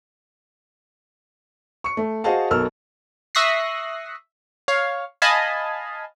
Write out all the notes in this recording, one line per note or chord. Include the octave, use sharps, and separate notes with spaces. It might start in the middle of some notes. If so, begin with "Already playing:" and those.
C#6 C#7
A3
F#4 G#4 C5 D#5 F5 A5
B1 B2 A4 A#4 E6 F6
E5 C#6 D#6 F#6 A#6 C7
C#5 F5
D#5 F5 G#5 A5 B5